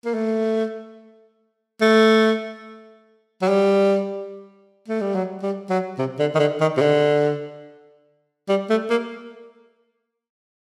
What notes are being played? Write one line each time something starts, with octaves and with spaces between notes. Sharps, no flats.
A#3
A3
A3
F#3
G3
A3
G3
F#3
G3
F#3
C3
D3
D#3
D3
D#3
C3
D3
G3
A3
A#3